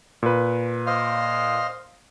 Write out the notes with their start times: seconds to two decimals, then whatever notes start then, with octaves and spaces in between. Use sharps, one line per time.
0.23 A#2 B4
0.87 C5 D#5 F5